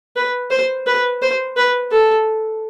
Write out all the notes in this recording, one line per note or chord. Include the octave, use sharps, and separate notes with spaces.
B4
C5
B4
C5
B4
A4